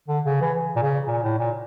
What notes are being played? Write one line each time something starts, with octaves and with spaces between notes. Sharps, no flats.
D3
C#3
E3
A#2
C#3
A#2
A2
A#2